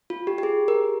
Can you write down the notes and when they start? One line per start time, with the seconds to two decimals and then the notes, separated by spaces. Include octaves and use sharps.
0.10 F4
0.27 G4
0.38 G4
0.43 G#4
0.68 A#4